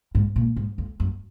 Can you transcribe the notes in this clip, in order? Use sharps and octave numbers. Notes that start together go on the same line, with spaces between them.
G#2
A#2
G#2
F2
F#2